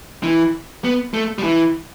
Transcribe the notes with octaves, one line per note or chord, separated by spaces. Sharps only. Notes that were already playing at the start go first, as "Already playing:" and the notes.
E3
B3
A3
G3
E3